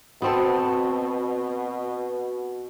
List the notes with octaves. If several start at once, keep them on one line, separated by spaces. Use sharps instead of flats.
B2 B3 C4 F#4 A4